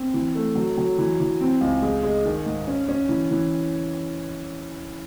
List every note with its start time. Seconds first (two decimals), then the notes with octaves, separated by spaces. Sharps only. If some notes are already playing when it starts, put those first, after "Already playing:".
Already playing: C4
0.14 E3
0.35 A3
0.55 F#3
0.78 F#3
0.98 E3
1.20 E3
1.41 C4
1.61 C#2
1.82 G#3
2.03 G#3
2.25 D#3
2.46 G#2
2.67 C#4
2.88 C#4
3.09 E3
3.31 E3